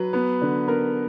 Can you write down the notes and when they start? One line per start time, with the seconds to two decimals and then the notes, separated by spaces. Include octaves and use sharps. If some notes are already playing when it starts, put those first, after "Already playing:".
Already playing: F#3 B4
0.13 B3
0.41 D3
0.67 B3 A#4